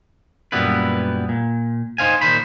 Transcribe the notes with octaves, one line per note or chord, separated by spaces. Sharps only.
F#2 A#2 G3 B3 E4 B4
A#2
D#4 C5 F5 G#5
A#2 D#3 C5 B5